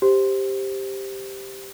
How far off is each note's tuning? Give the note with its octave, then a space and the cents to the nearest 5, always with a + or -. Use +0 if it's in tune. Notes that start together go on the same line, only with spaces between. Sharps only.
G4 +0 C5 +0